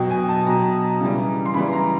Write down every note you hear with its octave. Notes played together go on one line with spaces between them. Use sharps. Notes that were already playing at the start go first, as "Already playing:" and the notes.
Already playing: B2 F#3 G5
G#5
A5
B2 F#3 A#5
C#3 E3 G3
C6
C#3 E3 G3 B5
A#5